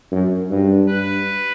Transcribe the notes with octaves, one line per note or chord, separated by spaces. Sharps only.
F#2
G2
B4